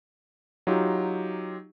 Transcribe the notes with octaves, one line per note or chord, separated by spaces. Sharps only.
F#3 D#4 F4 G4